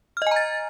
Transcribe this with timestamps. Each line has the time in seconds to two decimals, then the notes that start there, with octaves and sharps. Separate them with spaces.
0.17 F6
0.22 D#5
0.27 G#5
0.31 A#5
0.36 A6